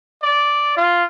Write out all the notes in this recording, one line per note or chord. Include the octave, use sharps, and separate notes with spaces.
D5
F4